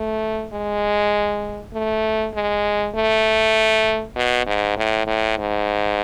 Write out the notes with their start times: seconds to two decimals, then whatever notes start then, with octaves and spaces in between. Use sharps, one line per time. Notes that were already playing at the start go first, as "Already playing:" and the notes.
Already playing: A3
0.53 G#3
1.74 A3
2.35 G#3
2.95 A3
4.16 B2
4.47 G#2
4.77 A2
5.07 A2
5.38 G#2